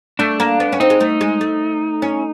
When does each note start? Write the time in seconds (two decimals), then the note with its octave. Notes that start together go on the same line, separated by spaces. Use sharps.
0.19 A3 D4
0.40 A#3
0.60 B3
0.72 C#4
0.80 C4 D#4
0.90 G#3
1.00 A3
1.21 G#3
1.41 A3
2.02 C#4